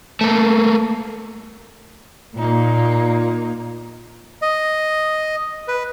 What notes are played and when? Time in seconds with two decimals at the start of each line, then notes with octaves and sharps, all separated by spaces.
0.21 A3 A#3
2.37 A#2 A#3 D#4
4.42 D#5
5.68 B4